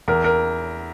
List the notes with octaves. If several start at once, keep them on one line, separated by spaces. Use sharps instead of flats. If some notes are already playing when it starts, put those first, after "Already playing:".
E2 A#4
A#4